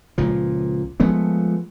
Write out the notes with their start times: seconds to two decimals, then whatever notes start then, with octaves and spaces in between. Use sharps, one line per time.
0.18 C#2 A#2 F3
1.00 F3 G#3 A3 B3